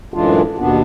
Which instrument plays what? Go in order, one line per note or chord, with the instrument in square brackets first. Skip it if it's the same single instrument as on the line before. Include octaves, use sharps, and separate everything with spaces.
[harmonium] F#2 A2 E3 G#3 D4 F4
D#2 B2 B3 D4